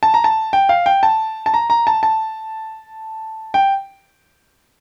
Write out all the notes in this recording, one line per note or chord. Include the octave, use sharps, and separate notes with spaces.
A5
A#5
A5
G5
F5
G5
A5
A5
A#5
A#5
A5
A5
G5